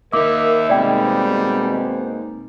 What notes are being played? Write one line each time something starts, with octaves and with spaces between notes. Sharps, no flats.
A#3 D#4 A#4 E5 D6
B2 G3 G#3 C4 D5 G5